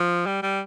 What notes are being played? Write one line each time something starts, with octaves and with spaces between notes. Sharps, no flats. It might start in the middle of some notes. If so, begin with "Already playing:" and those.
Already playing: F3
G3
G3